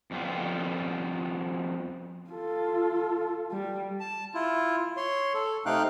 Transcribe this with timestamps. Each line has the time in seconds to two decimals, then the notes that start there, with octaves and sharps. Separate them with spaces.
0.11 F2 G3 B3 F4
2.31 F4 A4
3.52 G3
4.00 A5
4.34 E4 F4
4.97 C#5 C6
5.34 A4
5.66 C3 A3 D#4 F5 G5 F#6